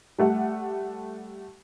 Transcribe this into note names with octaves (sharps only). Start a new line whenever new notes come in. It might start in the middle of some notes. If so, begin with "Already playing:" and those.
G3 A3 F#5